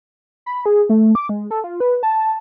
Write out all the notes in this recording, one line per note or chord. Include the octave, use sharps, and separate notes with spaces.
B5
G#4
A3
D6
G#3
A4
F4
B4
A5